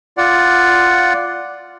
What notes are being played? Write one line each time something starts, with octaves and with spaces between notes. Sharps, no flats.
F4 D5 F#5